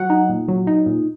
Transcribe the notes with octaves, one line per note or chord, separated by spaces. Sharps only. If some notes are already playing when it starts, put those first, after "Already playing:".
Already playing: F#3 F#5
D#4
A#2
F#3
D#4
A#2